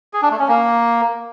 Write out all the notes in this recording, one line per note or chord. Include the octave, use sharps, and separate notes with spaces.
G#4
D4
A3
C#4
A#3